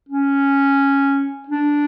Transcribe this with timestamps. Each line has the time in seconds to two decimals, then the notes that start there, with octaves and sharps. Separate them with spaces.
0.09 C#4
1.48 D4